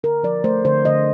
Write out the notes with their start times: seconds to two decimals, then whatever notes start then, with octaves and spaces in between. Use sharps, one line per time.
0.04 D3 A#4
0.23 F3 D5
0.44 A3 C5
0.65 D3 C5
0.85 D3 D#5